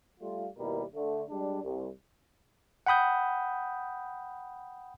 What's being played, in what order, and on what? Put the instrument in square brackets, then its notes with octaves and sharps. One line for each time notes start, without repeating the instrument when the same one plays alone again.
[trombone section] G3 A3 F4
D#2 B2 G3 E4 A#4
D3 A3
G3 G#3 D4
C2
[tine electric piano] F#5 G5 B5 D#6 G6